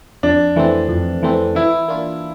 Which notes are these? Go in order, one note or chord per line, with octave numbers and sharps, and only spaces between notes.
F2 D4
E3 A3 C4
F2
E3 A3 C4
E3 E4
A#3 D4 F4